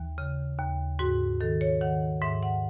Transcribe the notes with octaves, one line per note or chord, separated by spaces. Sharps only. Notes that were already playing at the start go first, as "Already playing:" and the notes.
Already playing: D#2 E3
C#3
D#2
G#2 F#4
D#3 A4
C#5
D#3 F#5
G#2 E5
F#5